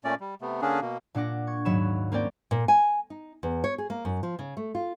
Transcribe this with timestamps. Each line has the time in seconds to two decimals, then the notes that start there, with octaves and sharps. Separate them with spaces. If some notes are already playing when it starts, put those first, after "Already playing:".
0.04 A#2 A3 C#4 D5
0.20 G3
0.41 C3 A3 B3
0.62 D3 A#3 C#4 D4 G#4
0.81 B2 A#3
1.14 A#2 D4 F#5 D6 A#6
1.47 C#6 G#6
1.65 D#2 G#2 F#3 C#5 B5 E7
2.12 A#3 C4 C#4 A#4 D5 G5
2.51 A#2
2.68 G#5
3.10 D#4
3.43 E2
3.64 C#5
3.78 G#4
3.90 A#3
4.05 F#2
4.23 F3
4.39 C#3
4.57 A3
4.75 F4